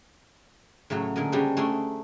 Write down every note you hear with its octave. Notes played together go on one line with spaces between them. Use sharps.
A2 C#3 F#3 F#4
A#2 D3 G#4 A#4 D#5
C#3 G3 G#3 D4 C5
A3 D4 G#4 A#4 C6